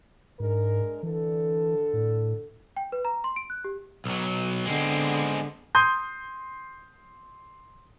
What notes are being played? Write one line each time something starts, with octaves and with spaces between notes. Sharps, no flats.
G#2 G#3 D4 A#4
D3 E3 D4 A4
A2
G5
B4
A#5
C6
D7
F#6
G4
B1 F#3
D3 G#3 B3 C4
C6 D#6 G6